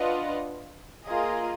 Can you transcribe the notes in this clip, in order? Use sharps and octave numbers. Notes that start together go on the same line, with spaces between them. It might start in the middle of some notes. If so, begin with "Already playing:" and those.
Already playing: D4 F4 B4 D#5 F#5
A#3 F4 G#4 D#5